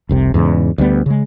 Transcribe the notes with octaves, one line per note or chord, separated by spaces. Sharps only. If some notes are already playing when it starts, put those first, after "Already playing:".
F1 C2 C3
E2 G#2 C#3
D2 G3 B3
C#3 G#3